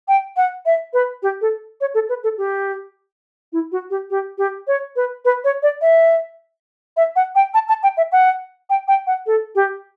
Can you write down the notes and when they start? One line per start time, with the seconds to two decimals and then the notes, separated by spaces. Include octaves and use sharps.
0.08 G5
0.37 F#5
0.66 E5
0.94 B4
1.23 G4
1.41 A4
1.81 C#5
1.94 A4
2.09 B4
2.24 A4
2.38 G4
3.53 E4
3.72 F#4
3.90 G4
4.10 G4
4.38 G4
4.67 C#5
4.96 B4
5.25 B4
5.44 C#5
5.63 D5
5.82 E5
6.97 E5
7.16 F#5
7.35 G5
7.54 A5
7.68 A5
7.83 G5
7.97 E5
8.12 F#5
8.70 G5
8.88 G5
9.07 F#5
9.27 A4
9.55 G4